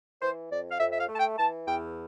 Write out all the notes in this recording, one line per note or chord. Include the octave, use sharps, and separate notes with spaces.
E3 C5
F2 D5
F5
F2 E5
E5
F5
A3
A5
G5
E3 A5
E2 G5